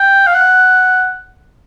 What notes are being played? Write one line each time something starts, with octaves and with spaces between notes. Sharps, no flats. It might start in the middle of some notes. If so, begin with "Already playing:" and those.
Already playing: G5
F5
F#5